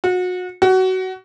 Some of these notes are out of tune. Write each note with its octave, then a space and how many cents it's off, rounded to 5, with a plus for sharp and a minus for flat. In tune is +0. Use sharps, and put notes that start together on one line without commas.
F#4 -30
F#4 +20